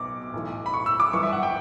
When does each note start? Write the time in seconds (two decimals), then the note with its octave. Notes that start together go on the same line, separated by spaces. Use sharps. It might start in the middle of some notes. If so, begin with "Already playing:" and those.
Already playing: B1 B2 D6
0.34 B1 A2 E3
0.66 B5
0.74 C#6
0.86 E6
1.00 D6
1.13 G1 G2 E3 C#6
1.23 E5
1.33 F#5
1.43 G5